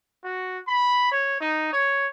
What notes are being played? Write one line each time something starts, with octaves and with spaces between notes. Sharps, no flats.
F#4
B5
C#5
D#4
C#5